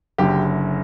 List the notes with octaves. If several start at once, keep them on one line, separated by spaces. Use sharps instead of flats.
F#1 F#2 D3 G4